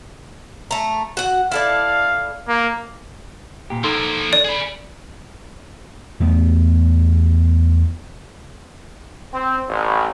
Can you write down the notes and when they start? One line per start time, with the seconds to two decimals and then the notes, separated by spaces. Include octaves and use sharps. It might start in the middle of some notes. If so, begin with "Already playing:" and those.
0.71 A3 A#5
1.17 F#4 F#5
1.51 E4 A4 D5 F5
2.48 A#3
3.70 A#2 G4
3.84 F3 A#3 D#4 A4 C6
4.33 D5
4.45 G#4 B5
6.20 E2 A3 B3
9.33 C4
9.69 A1